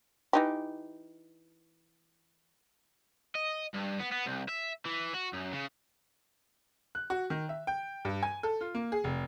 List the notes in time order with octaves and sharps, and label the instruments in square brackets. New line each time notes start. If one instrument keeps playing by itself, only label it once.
[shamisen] E3 D#4 G4
[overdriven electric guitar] D#5
G2
B3
B3
C2
E5
E3
F#4
F#2
C#3
[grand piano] F#6
F#4
D#3
E5
G5
G2
G#5
A4
F4
A#3
G#4
F1